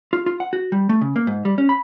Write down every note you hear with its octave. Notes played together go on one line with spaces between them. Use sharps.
F4
F4
F#5
F#4
G3
A3
C#3
A#3
G#2
G3
C#4
B5